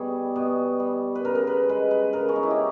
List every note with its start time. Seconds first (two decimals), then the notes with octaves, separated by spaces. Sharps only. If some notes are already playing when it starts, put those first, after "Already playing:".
Already playing: B2 G3 G#4
0.36 B2
0.80 G3
1.15 B4
1.25 C#3 A#4
1.35 A#4
1.47 B4
1.69 G#3 B4
1.91 B4
2.13 C#3 A#4
2.29 C#4
2.36 D#4
2.43 E4
2.50 G4